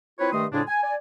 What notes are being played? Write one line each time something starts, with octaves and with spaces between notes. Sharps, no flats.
C4 E4 F4 B4 C#5
G2 D#3 A3 D#5 C6 D#6
F2 A2 C#3 G#3 D4
G#5
D5 G#5